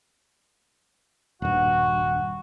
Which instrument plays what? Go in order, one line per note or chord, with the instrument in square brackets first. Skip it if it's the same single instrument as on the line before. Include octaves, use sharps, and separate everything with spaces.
[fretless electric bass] D#1 G2 [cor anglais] F#4